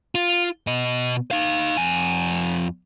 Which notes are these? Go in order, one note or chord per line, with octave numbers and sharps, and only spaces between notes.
F4
B2 D#5
D#4 F5
F2 G#5